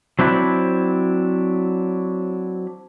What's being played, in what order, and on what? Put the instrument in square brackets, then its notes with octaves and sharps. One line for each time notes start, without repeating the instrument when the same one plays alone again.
[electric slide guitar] F#3 C4 D4 E4